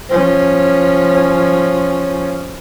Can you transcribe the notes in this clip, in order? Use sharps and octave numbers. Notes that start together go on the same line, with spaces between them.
F3 C#4